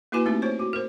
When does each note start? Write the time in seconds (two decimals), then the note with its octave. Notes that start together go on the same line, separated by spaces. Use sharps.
0.12 A#3 E4 F#4 B4 G#5
0.26 A3 C4 D#4 G4
0.42 F4 C5 C#5
0.59 F#4
0.73 A#4 C5